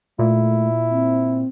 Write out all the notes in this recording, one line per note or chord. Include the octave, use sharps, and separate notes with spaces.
A#2 A3 E4
C4